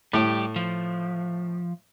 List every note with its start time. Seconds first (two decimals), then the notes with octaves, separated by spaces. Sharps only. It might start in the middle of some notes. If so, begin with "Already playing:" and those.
0.13 A2 G3 G4
0.56 F3